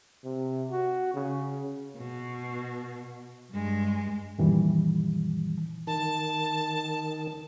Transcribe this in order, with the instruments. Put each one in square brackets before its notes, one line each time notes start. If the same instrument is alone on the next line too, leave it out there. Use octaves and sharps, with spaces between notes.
[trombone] C3
F#4
C#3
[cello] B2
G2 G#3
[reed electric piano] F#2 A#2 D#3 E3 G3
[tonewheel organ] D#3 [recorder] A5